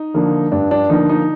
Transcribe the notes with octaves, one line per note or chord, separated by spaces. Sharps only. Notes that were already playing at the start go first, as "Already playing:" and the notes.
Already playing: D#4
D3 F3 A#3
G2 D4
D4
D3 F3 A#3 D#4
D#4